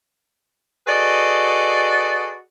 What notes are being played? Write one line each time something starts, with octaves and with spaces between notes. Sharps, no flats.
F#4 G#4 A4 B4 D5 D#5